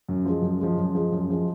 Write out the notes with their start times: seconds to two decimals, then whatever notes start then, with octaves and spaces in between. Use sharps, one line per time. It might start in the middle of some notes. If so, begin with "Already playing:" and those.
0.09 F#2
0.25 F3 G#3
0.42 F#2
0.60 F3 G#3
0.77 F#2
0.95 F3 G#3
1.12 F#2
1.29 F3 G#3